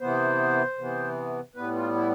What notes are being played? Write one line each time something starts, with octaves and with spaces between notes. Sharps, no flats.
C3 E3 B3 C5
C3 E3 B3
A2 G3 B3 B4
F4
E4